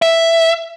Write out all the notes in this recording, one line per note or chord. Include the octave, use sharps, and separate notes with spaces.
E5